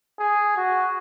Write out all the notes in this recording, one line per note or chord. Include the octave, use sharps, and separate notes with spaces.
G#4
F#4